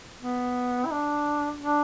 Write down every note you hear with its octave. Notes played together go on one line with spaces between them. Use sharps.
B3
E4
D4
D4